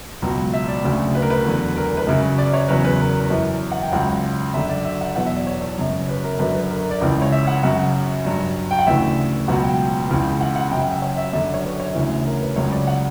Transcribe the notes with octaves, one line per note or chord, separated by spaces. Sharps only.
C#2 B2 F#3
E5
D5
D2 C#3 F#3
B4
A#4
B4
E2 D3 F#3
A#4
B4
F#2 C#3 F#3
D5
C#5
E2 C#3 F#3 B4
B4
A#4
F#2 E3
F#5
G5
C#2 C#3 F#3 F#5
F#2 D3 F#3 E5
D5
E5
F#5
E2 B2 F#3 F#5
E5
D5
C#5
F#2 C#3 F#3
B4
A#4
F#2 D3 F#3 B4
B4
A#4
D5
C#2 C#3 E3
C#5
E5
F#5
F#2 C#3 F#3 F#5
G2 F#3
G5
F#5
D2 C#3 E3 E5
C#2 B2 F#3 F#5
G5
C#2 C#3 E3
F#5
F#5
F#2 C#3 F#3 G5
F#5
E5
C#5
E5
F#2 D3 F#3 D5
C#5
B4
C#5
D2 C#3 E3
A#4
B4
C#2 C#3 F#3 C#5
D5
F#5